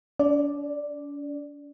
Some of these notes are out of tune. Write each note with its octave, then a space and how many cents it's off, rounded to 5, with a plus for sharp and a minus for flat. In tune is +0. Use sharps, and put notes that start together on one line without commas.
D4 -45 D5 +0